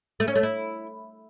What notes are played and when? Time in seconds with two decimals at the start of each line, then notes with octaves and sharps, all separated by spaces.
0.20 A3
0.28 C#4
0.35 A3
0.43 E4